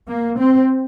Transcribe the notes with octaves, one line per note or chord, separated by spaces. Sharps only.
A#3
C4